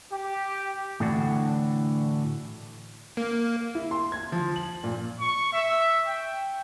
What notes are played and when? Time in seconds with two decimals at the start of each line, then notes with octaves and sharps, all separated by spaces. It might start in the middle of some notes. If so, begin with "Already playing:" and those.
0.10 G4
1.00 A2 D3 E3 D4 F#4
3.17 A#3
3.75 E4
3.91 C6
4.12 G#6
4.32 F3
4.56 F#7
4.84 A#2
5.20 C#6
5.53 E5
6.07 G5